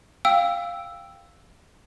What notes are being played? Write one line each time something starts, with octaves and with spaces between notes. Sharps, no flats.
F5 G5 E6